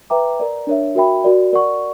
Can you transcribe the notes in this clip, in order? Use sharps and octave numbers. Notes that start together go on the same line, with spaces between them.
B4 E5 G5 A#5 D6
A#4 D5 A#5
D4 A#4 C#5 E5
F#4 A#4 E5 G5 B5
F#4 A#4 D5
A#4 D5 F#5 C#6